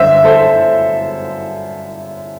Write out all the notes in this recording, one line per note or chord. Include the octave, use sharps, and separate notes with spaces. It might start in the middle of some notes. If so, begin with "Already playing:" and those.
Already playing: G1 F#2 D3 C5 E5
A4 C5